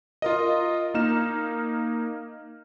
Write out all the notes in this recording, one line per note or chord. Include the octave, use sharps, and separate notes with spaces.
F4 A#4 D#5
A#3 D#4 F6 E7